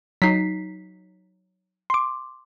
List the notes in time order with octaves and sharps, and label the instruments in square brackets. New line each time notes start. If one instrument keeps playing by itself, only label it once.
[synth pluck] F#3 D#4 [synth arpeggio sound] B6 C7
[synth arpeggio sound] C6 D6